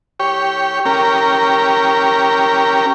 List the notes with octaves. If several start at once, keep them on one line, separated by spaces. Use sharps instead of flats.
G4 C#5
C#4 G4 A#4